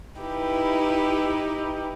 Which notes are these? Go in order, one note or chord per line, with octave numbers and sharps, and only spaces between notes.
D#4 E4 G4 B4